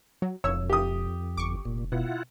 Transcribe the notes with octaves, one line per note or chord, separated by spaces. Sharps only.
F#3
E1 F2 C#5 E6
G4 D#6
G1 C#6 D6
F1 A#2
B2 E4 F4 F#5